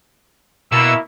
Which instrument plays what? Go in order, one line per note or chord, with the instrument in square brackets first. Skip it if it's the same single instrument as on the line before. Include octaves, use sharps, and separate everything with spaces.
[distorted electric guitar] B2 [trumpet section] A#3 E4 [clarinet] E6